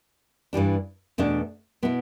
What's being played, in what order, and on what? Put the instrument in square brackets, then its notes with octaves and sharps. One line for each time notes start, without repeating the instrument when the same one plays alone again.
[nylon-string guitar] G2 E3 G3 D4
E2 B2 A3 D4
B2 B3 E4